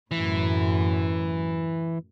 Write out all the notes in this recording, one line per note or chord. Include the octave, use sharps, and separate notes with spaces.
F#2 A2 E3